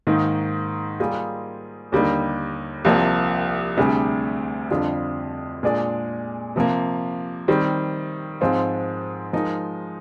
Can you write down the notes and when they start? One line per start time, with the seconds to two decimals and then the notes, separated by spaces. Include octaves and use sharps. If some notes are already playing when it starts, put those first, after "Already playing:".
0.07 G#2 D#3 A#3 D#4
1.00 G3 A#3 F4 G#4
1.92 D#2 D3 G3 A#3 D#4
2.85 C2 C3 F3 A#3
3.77 D2 C3 G3 D4 G#4
4.70 F2 D3 G3 D4 F4
5.63 A#2 G#3 D4 G#4 D5
6.56 C3 F3 A#3
7.48 D#3 G3 C4
8.41 G#2 F3 G#3 C4 F4
9.33 F3 G#3 D#4 A#4